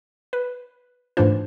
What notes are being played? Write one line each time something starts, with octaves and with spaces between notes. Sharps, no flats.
B4
G#2 E3 A3 D4 F4 C5